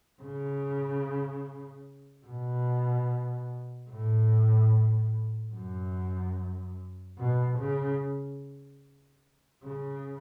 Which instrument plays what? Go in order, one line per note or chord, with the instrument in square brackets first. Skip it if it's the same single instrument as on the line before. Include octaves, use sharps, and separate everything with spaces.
[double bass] C#3
B2
A2
F#2
B2
C#3
C#3